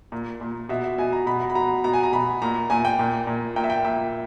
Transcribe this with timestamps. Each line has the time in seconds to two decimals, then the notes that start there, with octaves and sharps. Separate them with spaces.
0.12 A#2
0.41 A#2
0.69 B2 E5
0.84 E5
0.98 B2 G#5
1.12 A#5
1.26 B2 B5
1.42 A#5
1.50 B5
1.55 B2 A#5
1.84 B2 A#5
1.93 G#5
2.03 A#5
2.13 B2 B5
2.42 A#2 A#5
2.70 A#2 G#5
2.85 G5
2.99 A#2
3.27 A#2
3.56 A#2 G5
3.64 E5
3.70 G5
3.84 A#2 E5